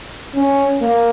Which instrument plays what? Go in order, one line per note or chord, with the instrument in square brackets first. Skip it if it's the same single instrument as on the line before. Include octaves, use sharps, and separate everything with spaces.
[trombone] C#4
A#3